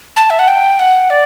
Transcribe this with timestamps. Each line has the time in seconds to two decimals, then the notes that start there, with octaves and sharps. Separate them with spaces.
0.16 A5
0.30 E5
0.39 F#5
0.48 G5
0.79 F#5
1.10 D5